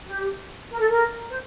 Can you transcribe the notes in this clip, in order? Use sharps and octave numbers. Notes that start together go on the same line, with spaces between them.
G4
A#4
A4
A#4
C5